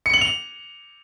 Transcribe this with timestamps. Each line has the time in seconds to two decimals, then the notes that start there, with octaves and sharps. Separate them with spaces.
0.06 C#7
0.14 F#7
0.21 F7